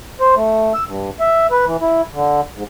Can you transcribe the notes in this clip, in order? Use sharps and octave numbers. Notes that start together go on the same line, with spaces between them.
C5
A3
E6
G2
E5
B4
E3
E4
D3
G#2